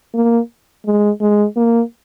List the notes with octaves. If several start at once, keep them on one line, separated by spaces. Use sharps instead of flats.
A#3
G#3
G#3
A#3